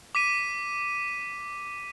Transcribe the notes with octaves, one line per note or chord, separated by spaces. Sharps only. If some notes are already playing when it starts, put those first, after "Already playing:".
D6 B6 D#7